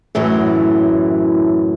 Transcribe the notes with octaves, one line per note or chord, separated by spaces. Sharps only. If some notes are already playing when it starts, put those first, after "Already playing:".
F#2 A2 E3 F#3